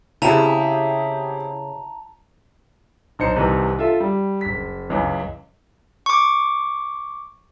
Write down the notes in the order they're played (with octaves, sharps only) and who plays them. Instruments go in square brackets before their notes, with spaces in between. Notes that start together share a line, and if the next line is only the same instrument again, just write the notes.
[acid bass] C#3 [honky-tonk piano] C4 G4 G#4 [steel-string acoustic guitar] E4 [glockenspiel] A5 A#5 F7
[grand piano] B1 D#4 C5 C#7
C2 C3 D#3 E3
F4 A4 E5
G3
F#1 B6
C#2 F#2 E3
[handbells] C#6 D6